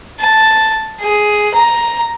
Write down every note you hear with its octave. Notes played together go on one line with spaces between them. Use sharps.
A5
G#4
A#5